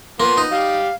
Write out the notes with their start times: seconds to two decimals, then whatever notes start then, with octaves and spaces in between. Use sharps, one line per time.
0.20 F3 A#3 B3 C6
0.38 D#4
0.51 G3 G4 F5